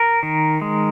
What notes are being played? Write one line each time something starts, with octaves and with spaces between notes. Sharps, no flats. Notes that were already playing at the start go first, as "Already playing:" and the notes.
Already playing: A#4
D#3
G#3